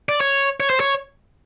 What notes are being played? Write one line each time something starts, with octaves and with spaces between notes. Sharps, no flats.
D5
C#5
C#5
C5
C#5